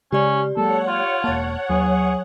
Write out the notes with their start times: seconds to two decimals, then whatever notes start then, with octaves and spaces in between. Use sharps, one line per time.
0.12 C#3 G#3 C#4 G4 D5
0.57 F#3 G#3 A#3 A4 C#5 F#5
0.88 F4
1.24 E1 A#3 A5 F6 A6
1.70 D#2 F#3 G#4